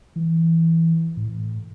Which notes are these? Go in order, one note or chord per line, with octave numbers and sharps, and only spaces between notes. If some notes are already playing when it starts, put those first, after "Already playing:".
E3
A2